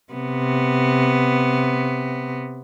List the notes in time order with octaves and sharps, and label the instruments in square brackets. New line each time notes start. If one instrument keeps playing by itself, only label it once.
[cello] C3 B3